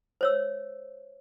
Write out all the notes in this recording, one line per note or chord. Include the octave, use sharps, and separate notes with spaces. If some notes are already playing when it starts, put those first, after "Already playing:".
C5 C#5 E6